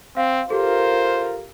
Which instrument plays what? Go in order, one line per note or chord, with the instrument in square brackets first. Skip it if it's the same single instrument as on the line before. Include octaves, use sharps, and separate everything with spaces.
[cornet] C4 [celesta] F5
[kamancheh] F4 A#4 [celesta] G4 A4 [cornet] C5